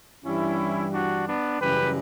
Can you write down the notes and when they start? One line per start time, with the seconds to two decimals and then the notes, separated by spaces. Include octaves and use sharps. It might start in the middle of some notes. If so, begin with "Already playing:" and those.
0.25 G2 E3 G3 C#4 E4
0.93 D4 F#4
1.27 B3 D4
1.60 F#2 C#3 E3 G3 G4 B4